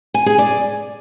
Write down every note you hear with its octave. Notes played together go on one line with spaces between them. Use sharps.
G#5
G#4
D5